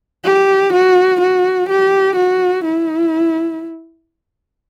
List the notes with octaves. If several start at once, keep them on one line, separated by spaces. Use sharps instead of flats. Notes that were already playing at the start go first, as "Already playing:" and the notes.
G4
F#4
F#4
G4
F#4
E4